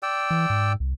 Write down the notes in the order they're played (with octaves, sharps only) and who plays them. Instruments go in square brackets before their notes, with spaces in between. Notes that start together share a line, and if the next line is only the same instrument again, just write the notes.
[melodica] D5 G5 E6
[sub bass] E3
G#2
C2